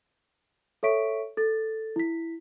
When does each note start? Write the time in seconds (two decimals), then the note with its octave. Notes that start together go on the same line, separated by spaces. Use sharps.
0.83 A4 C#5 E5 C#6 B6 D7
1.37 A4 A6
1.96 E4 B6